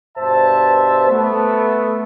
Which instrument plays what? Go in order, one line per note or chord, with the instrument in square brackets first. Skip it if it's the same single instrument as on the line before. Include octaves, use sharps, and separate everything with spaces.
[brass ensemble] G2 B2 C5 E5 A5
A3 B3